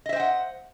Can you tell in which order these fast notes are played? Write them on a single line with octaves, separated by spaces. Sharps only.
D#5 E5 C5 G5 F#5